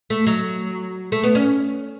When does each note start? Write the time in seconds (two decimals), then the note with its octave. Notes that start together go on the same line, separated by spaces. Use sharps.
0.10 A3
0.27 F#3
1.12 A3
1.23 B3
1.35 C#4